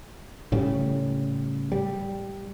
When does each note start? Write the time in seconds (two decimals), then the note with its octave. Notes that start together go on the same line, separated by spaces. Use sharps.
0.52 A2 C#3 G3
1.72 G3